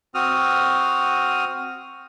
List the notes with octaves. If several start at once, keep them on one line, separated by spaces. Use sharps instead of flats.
C4 F#4 D#6 F6